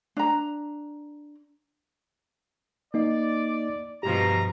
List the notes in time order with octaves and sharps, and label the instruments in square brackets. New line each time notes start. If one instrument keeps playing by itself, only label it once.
[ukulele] D4 A#5
[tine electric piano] A#3 D#4 D#5 [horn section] D5
[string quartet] G2 B2 F3 [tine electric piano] G4 [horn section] A#5